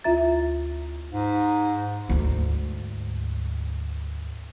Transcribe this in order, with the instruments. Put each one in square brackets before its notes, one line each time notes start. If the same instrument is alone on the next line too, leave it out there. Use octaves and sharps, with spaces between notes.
[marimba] D2 E4 F4 E5 A#5 A6
[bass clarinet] G#2
[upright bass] D2 G#2